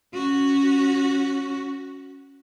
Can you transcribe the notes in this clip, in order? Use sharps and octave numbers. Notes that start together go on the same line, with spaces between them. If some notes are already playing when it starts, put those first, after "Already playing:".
C#4 F#4